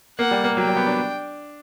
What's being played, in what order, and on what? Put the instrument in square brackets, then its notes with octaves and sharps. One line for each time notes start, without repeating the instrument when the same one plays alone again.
[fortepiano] A#3 [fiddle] F#5
[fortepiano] G3
A#3
[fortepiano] F#3 [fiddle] G5
[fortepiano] G3
B3
D4